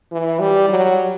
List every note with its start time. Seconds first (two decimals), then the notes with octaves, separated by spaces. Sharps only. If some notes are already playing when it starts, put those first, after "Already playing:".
0.12 E3
0.40 G3
0.69 F#3